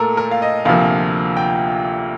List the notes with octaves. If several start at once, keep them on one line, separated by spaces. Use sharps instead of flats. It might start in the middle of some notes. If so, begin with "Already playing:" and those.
Already playing: A#2 A3 A4 A#4
A#4
F5
D#5
D2 C3 F3 A#3 F5
G5